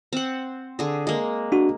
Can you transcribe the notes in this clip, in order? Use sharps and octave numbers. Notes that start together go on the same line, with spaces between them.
C4 F#5
D3 G#4
G#3 A#3
D4 F#4